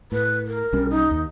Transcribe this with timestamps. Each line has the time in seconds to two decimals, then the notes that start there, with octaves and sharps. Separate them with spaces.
0.12 A2 B4
0.47 A#4
0.73 B1 G3 C#4
0.90 D#4
1.11 D#2